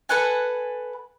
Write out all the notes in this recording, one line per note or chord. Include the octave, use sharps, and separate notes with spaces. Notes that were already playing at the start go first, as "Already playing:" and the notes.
A4 B4 F#5 G#5